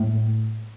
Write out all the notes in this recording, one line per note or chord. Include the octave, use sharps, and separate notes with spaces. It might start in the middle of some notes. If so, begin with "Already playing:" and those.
Already playing: A2